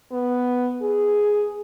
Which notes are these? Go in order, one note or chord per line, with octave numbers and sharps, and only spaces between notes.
B3
G#4